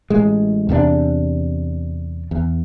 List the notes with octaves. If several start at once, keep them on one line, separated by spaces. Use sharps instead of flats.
A1 A2 G#3
E2 C3 A3 D4
E2